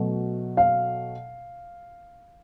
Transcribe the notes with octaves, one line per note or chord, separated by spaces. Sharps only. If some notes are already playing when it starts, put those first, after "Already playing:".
Already playing: B2 F#3 A3
F5